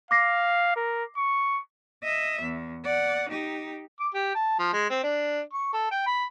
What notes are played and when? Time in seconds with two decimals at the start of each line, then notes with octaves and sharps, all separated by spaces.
0.11 F5 D6 A#6 C7
0.76 A#4
1.18 C#6
2.04 D#5 E5
2.42 E2
2.85 D5 F#5
3.30 D#4 G4
4.00 D6
4.14 G4
4.35 A5
4.59 F3
4.73 G#3
4.90 C4
5.03 D4
5.53 C#6
5.73 A4
5.91 G5
6.06 B5